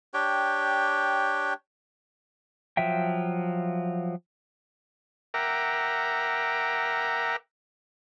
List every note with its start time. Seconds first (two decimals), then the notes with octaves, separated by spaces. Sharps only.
0.14 D4 G4 C#5 G5
2.77 F3 F#3 E5 G5
5.34 A#4 E5 F#5 G5 A#5 D6